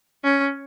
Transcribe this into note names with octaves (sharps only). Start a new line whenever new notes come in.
C#4